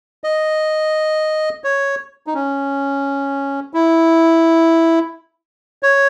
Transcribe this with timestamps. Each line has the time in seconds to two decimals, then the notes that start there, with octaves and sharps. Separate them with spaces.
0.24 D#5
1.64 C#5
2.27 D#4
2.34 C#4
3.74 E4
5.83 C#5